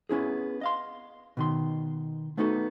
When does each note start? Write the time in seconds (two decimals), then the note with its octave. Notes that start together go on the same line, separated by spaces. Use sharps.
0.09 B3 C#4 E4 G#4
0.61 D#5 F5 C6
1.37 B2 D#3 C6
2.37 A3 B3 D#4 F#4 A4